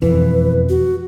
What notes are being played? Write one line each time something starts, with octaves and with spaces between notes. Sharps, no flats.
E1 F2 E3 B4
F#4